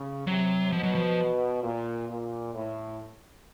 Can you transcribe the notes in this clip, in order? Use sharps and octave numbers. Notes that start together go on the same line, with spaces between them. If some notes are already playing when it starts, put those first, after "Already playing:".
Already playing: C#3
C3 F#3
B2 F3
F#3
F3
A#2
A#2
A2